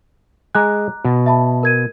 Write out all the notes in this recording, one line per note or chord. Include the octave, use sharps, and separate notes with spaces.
G#3 G#5 A#5 D6 F#6
B2
E5 A5 B5
A#4 G#6 D#7